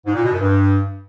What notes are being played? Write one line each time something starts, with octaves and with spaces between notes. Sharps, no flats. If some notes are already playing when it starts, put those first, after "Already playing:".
G#2
A#2
B2
F#2
G2